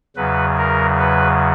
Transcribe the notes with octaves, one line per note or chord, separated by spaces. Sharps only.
E2 C#3 F#3 B4
A#4
B4